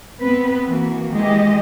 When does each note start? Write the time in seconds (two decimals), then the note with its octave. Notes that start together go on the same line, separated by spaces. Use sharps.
0.20 B3 C4 B4
0.68 E3 A#3 F#4
1.12 E3 G#3 G4 D#5